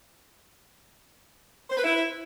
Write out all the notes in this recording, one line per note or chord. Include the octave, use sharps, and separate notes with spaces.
C5
B4
E4